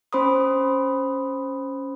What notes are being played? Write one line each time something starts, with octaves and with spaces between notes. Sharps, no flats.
C#4 C5 B5 C6 D#6